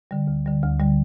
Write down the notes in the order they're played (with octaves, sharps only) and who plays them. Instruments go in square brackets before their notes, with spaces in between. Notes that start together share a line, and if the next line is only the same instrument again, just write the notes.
[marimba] D3 G3
D2
D3 G3
D2
D3 G3